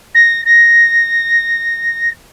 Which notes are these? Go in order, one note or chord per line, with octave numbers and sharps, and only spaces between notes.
A#6
A#6